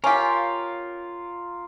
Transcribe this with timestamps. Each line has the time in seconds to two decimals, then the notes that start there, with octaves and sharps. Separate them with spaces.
0.04 C#4 F4 G4 A#4